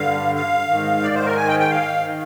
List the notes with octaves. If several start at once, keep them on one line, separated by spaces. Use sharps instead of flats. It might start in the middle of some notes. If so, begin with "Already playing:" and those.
Already playing: G2 D3 F5
F5
G#2 D#3
D5
C5
A#4
G#5
G5
G5
F5
D#3